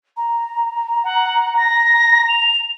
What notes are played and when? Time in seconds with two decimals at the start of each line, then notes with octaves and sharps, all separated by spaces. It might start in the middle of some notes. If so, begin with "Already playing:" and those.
0.17 A#5
1.04 F#5
1.57 A#6
2.28 F7